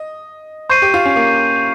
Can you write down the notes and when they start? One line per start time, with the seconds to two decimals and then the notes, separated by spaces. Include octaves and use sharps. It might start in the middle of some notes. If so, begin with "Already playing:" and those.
Already playing: D#5
0.69 C5 C#6 G6 C7 D#7
0.82 G4
0.94 F4
1.05 C#4
1.16 A#3